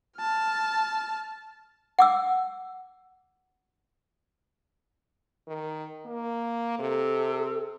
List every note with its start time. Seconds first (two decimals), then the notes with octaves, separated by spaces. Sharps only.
0.18 A5 F6
1.99 F#5 D6 E6
5.47 D#3
6.05 A#3
6.79 C3 A4